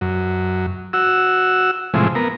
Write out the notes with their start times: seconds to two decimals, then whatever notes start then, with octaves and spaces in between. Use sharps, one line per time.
0.01 F#2
0.93 F#4 E6
1.94 A2 C3 E3 F3 G#3
2.15 B3 A#4